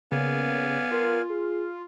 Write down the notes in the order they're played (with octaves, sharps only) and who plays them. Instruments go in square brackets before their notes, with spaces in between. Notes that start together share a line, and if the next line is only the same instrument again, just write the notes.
[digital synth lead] C#3 [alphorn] A#3 [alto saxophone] B3 [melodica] D5 F5 G#5
[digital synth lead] F4 [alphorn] A#4
[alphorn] G#4